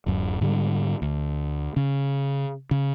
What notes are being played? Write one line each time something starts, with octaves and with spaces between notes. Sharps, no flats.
D1 F#2
G#2 D3 F#3 G3
D2
C#3
C#3